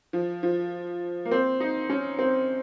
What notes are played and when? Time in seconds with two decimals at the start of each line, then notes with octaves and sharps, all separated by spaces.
0.13 F3
0.43 F3
1.25 A#3
1.31 C4
1.60 D#4
1.90 C#4
2.19 C4